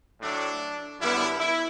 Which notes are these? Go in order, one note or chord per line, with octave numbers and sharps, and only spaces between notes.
A2 F#3 A3 D4
F#2 D3 G3 B3 E4
E4